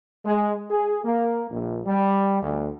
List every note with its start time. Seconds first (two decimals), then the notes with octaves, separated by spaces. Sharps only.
0.25 G#3
0.70 G#4
1.05 A#3
1.51 A#1
1.85 G3
2.42 D2